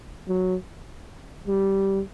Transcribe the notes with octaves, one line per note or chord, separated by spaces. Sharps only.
F#3
G3